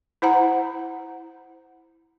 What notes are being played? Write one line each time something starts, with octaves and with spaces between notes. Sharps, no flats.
E4 C5 F#5 A#5